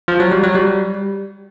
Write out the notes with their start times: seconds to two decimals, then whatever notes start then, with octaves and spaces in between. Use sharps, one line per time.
0.08 F3
0.20 F#3
0.32 G3
0.43 F#3
0.55 G3